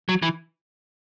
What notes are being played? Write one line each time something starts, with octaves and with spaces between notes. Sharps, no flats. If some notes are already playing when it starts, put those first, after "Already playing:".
F#3
E3